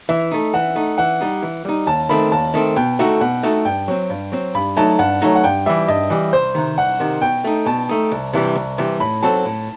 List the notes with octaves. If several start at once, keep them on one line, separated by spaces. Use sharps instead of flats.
E3 E5
A3 D#4
E3 F#5
A3 D#4
E3 F#5
G3 D#4
E3
G3 D#4
D#2 A5
D#3 A3 C4 B5
D#2 A5
D#3 A3 C4
B2 G5
A3 D#4 F#4 A4
B2 F#5
A3 D#4 F#4 A4
G2 G5
F#3 C4
G2
F#3 C4
G2 B5
F#3 A3 D#4 A5
G2 F#5
F#3 A3 D#4
F#5
G2 G5
E3 G3 E5
G2 D#5
E3 G3
C2 C5
C3 D#3
C2 F#5
C3 D#3
B2 G5
A3 D#4
B2 A5
A3 D#4
C2
C3 E3 G3
C2
C3 E3 G3
A2 B5
F#3 C4 F#4 A4 A5
A2